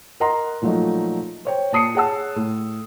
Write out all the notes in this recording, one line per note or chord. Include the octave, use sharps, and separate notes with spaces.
A#4 D#5 F#5 A#5 C6
A#2 F3 F#3 A3 D#4
C5 C#5 G5
A#2 A5 D#6 C7 C#7
G#4 C#5 F#5 A5 E6
A2